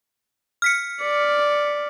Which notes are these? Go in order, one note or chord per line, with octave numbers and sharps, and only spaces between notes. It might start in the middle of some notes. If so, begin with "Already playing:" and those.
F6 B6 C#7
D5